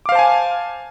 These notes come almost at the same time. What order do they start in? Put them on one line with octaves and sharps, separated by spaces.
D6 F5 C5 A5 G#5